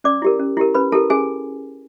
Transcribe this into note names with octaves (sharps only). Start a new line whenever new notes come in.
C#4 D5 D6
E4 G4 A#4
C#4
E4 G4 A#4
C#4 B4 B5
E4 G4 A4 A#4 A5
C#4 G#4 G#5